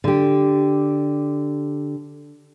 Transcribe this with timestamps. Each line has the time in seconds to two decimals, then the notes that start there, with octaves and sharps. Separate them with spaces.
0.04 D3 G4